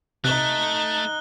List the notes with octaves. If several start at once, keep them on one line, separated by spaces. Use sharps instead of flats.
C3 A3 D#4 F#6 G7